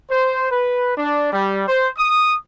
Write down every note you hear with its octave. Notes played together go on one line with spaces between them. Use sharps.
C5
B4
D4
G3
C5
D#6